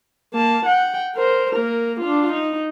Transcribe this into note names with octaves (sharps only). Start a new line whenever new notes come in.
A#3 A5
F#5 G5
A#4 C5
A#3 A#4
D4 F4
D#4